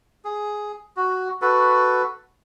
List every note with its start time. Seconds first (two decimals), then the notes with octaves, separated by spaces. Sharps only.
0.24 G#4
0.97 F#4
1.42 F#4 A4 B4